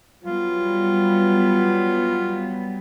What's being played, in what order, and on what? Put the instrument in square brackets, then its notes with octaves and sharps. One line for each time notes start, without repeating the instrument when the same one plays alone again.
[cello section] F#3 G3 B3 [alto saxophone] F4